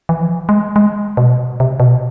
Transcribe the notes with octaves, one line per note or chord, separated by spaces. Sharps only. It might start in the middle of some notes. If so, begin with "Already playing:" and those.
E3
F3
G#3
G#3
B2
C3
B2